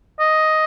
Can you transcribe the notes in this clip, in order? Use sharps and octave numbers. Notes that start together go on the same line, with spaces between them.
D#5